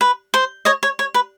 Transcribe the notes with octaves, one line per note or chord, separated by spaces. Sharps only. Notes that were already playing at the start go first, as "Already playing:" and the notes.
B4
C5
C#5 D#5
C#5
C#5
B4